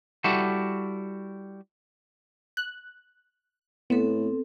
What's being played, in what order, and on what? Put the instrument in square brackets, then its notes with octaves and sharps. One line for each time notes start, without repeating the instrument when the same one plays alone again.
[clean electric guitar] G3 E4 F#4 A4
[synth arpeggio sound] F#6
[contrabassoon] A2 [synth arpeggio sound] B3 [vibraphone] C4 A4